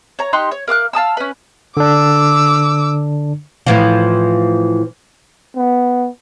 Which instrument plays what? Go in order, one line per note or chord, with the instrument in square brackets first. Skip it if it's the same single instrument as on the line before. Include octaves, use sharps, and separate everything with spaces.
[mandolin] C#5 A#5
D#4 G4 C6 F#6
C#5
A#4 F5 D6 F#6
F5 A5 D#6 E6
C#4 B4
[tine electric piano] D3 D4 [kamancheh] D6 E6
[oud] A2 E3 F3
[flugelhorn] B3